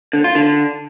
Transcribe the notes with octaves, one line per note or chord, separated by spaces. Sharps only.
D3
F4
D3